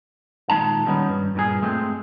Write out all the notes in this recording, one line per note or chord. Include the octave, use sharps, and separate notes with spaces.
A#2 D#3 G#3 D#4 A5
D#3 G3 B3 C#4 D#4
G2
G2 A#2 G#4
G#3 A3 C4